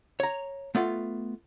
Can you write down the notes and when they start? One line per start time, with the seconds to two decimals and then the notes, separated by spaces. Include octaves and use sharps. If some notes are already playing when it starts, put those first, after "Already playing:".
0.20 C#5 A#5
0.75 A3 B3 F4